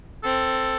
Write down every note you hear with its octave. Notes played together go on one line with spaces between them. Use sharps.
C4 A4